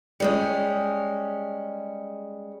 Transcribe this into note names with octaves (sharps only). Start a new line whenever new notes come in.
G3 G#3 C#4